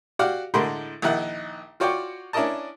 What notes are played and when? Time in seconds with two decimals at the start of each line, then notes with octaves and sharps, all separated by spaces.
0.19 F#4 G4 D5 F5 F#5
0.54 A2 D3 G#3 A#4 B5 C6
1.02 A#1 D#3 D#4 E4 F#5
1.80 F4 F#4 C#5 D5 G5 D6
2.33 C#4 D4 E4 A#4 D#5 A5